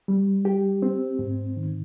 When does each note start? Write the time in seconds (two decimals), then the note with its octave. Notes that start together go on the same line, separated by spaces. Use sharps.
0.08 G3
0.45 G4
0.82 C4
1.19 G#2
1.57 D#3